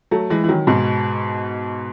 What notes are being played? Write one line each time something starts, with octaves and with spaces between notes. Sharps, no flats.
F#3 A3
E3 G#3
E3
D#3 F#3
G#2 B2